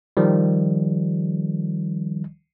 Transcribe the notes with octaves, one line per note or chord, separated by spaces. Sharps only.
D#3 F3 G3